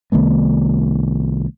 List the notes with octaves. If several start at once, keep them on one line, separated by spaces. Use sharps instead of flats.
C2 D#3 A3 B3